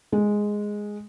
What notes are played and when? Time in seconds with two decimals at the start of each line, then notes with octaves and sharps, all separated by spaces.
0.12 G#3